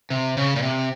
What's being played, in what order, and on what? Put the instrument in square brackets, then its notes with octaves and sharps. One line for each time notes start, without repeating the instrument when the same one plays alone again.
[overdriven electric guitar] C3
C#3
A#2
C3